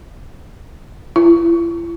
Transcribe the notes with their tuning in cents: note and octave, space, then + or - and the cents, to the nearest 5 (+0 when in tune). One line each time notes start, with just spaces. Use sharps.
E4 +35